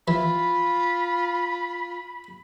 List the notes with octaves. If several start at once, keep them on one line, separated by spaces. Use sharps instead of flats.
E3 F4 B5